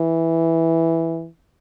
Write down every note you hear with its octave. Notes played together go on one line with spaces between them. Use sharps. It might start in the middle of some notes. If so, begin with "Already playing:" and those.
Already playing: E3